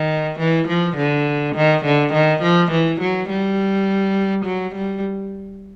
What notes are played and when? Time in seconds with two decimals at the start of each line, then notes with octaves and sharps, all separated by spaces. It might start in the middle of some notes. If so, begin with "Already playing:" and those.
Already playing: D#3
0.39 E3
0.68 F3
0.97 D3
1.55 D#3
1.85 D3
2.13 D#3
2.42 F3
2.72 E3
3.01 F#3
3.29 G3
4.45 F#3
4.75 G3